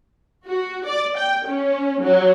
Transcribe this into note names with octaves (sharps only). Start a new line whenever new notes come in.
F#4
D5
G5
C#4
F#3